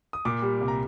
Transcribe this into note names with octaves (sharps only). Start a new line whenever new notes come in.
D#6
A#2 D6
G3
C2
A#5